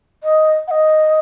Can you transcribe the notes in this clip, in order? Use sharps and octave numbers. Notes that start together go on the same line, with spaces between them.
D#5
F#5
D#5